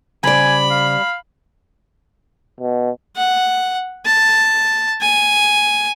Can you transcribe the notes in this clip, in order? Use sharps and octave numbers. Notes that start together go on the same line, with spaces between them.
C#3 G3 C5 D5 G#5 B5
F5
B2
F#5
A5
G#5